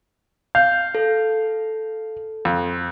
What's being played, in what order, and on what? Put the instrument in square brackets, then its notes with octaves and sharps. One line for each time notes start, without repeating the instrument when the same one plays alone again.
[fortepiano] F5 [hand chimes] G6
[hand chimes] A4
[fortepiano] F2